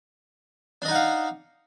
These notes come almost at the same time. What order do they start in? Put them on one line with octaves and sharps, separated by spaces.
D4 D#5 D#4 F#5 F5